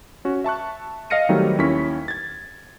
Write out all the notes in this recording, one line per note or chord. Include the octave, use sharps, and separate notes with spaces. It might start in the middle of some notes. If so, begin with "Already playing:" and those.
C#4 F#4
E5 A5 C#6 F#6
D#5 F5 F6 A#6 C#7 D#7
D#3 F#3 G3 A3 C4 D#4
D#2 C#4 E4 C#6 B6
G#6 A6